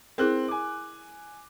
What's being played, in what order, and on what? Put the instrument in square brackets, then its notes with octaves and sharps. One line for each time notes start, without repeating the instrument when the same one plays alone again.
[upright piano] C4 F#6 [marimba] E4 G#4 A#4
[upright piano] G#5 D6